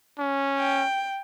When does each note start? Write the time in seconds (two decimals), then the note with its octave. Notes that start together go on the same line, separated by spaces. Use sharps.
0.19 C#4
0.59 G5